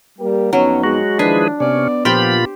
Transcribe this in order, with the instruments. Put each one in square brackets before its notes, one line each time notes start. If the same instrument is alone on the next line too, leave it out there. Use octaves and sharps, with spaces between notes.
[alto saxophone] G3 [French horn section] A#3 G4 A#4
[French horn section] F2 B3 D#4 [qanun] F#3 [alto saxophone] C#4
[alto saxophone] G#3 [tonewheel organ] F#4
[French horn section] D#3 F3 E4 [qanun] D4 [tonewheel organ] G#4 B4
[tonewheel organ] C3 C#4 [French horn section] B3 [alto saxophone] D5
[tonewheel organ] A#2 F4 B5 [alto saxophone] F3 [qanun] G4 C5 G5